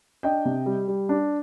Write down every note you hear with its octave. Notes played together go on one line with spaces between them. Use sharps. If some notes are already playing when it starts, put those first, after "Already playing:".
D4 D#5 G5
C3
G3
G3
D4